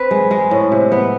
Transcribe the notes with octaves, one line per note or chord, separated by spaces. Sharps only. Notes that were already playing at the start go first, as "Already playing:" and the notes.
Already playing: C4 B4
G#3
G#3
A2
C3
B3